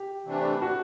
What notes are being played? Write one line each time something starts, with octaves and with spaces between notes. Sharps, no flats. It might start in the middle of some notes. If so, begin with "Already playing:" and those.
Already playing: G4
C3 E3 A3 D4
F#4